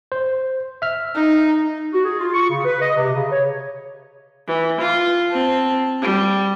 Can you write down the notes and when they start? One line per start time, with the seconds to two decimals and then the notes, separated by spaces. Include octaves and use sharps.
0.12 C5
0.82 E5 F6
1.15 D#4
1.93 F#4
2.04 G#4
2.19 F4
2.34 C#6
2.50 C#3
2.64 B4
2.81 D#5
2.96 C3
3.13 C#3
3.31 C#5
4.47 E3
4.81 F4
5.31 C4 A5
6.01 G3